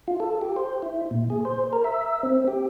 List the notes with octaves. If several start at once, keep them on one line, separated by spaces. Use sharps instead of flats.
F4
A4
G4
C5
E4
A#2
G#4
C5
A#4
E5
C4
G4